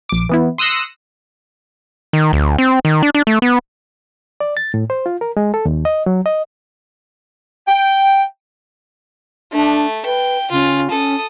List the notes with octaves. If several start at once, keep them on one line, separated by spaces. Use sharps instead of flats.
A#1 D6
E3 B3 E4
C6 D#6 E6 F#6 A#6 C#7
D#3
D2
C4
D#3
D4
D4
A3
B3
D5
A6
A2
C5
F4
A#4
G#3
A4
D#2
D#5
F#3
D#5
G5
A3 D4
B4 G5
C#3 F4
C#4 A4 D#6